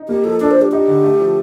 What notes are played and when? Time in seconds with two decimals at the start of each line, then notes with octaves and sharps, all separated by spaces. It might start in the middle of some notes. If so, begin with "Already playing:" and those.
Already playing: D#4
0.09 A#3 G4
0.24 F3 A4
0.40 D4 A4
0.51 D4 C5
0.62 G4
0.72 D#4 G4
0.88 D3
1.03 A3
1.20 F3